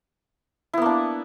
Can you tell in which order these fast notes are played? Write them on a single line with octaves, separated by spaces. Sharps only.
E4 B3 A#3 D4